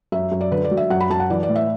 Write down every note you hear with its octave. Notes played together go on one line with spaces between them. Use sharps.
F#2 E5
F#2
D5
D3 B4
D5
F#3
E5
F#2 F#5
B5
F#2 A5
F#5
E3 D5
D5
A2
E5